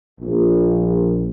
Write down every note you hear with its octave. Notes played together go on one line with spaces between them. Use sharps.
A#1